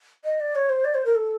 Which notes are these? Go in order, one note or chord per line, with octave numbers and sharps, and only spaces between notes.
D#5
D5
C#5
C5
D5
C5
A#4
A4